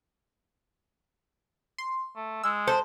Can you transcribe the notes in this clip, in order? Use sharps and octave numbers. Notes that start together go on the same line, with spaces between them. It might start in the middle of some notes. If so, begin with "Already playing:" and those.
C6
A3
G#3 E6
A4 C5